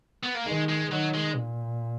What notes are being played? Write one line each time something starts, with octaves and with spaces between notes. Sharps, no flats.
B3
A#3
D#3 G#3
G#3
D#3 F#3
G#3
A#2